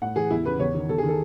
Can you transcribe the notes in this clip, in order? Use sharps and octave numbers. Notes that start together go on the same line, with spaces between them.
A2 F#5
E3 G#4
E2 E4
C#3 E3 B4
E2 C#5
D#3
E2 A4
G#4
D#3
A4